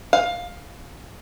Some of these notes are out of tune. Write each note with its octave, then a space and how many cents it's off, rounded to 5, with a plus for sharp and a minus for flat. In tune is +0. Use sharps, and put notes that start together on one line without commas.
F5 +15